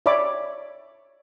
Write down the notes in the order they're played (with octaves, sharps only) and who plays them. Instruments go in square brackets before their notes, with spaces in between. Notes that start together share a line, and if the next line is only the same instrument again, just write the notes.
[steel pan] C#5 D5 E5 B5 D6